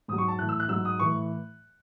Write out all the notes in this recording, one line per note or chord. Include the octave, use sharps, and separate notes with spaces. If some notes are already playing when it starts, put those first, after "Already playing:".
G#2 F#3 D#6
C#6
A5
A2 E3 F#6
E6
F#6
G#2 F#3 E6
D#6
A2 E3 C#6